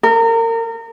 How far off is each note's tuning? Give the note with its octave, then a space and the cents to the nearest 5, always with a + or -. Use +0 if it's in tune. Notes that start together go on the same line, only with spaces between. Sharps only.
A#4 -30